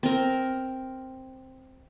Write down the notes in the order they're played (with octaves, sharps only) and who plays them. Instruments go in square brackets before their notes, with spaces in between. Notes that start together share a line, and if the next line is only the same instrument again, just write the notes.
[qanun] C4 A#4